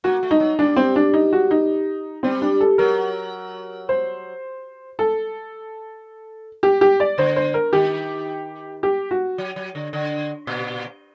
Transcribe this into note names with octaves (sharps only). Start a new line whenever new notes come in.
A#3 F#4
A3
D#4
F#3
G3 D4
C4
D4
D#4
F#4
D#4
G3 C4
D4
A4
F#3 A#4
C5
A4
G4
G4
D5
D3 C5
C5
A#4
D#3 G4
G4
F#4
F#3
F#3
D3
D3
A#2